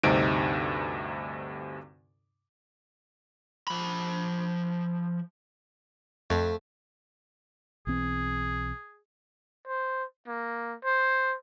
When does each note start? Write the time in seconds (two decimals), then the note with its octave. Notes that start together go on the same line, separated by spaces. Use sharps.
0.03 D2 G2 C3 C4 D#4 D7
3.68 F3 B5
6.30 F2 A3
7.87 B1 E3 C4 G#4
9.68 C5
10.27 A#3
10.84 C5